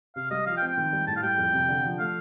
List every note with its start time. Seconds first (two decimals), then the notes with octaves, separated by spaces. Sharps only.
0.16 C3 F5
0.30 G3 D#5
0.46 F3 F5
0.57 G5
0.62 C4
0.67 G5
0.77 D#3
0.93 G3
1.07 A2 A5
1.16 F5
1.22 G3 G5
1.37 F2
1.53 C3
1.68 D3
1.84 F3
1.99 A3 F5